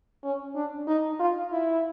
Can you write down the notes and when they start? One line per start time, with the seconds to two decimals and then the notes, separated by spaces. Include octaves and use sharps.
0.24 C#4
0.55 D4
0.87 D#4
1.19 F4
1.52 E4